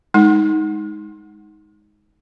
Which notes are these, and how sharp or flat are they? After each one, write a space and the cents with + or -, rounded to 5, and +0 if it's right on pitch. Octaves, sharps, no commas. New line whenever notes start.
G#3 +0 D#4 +15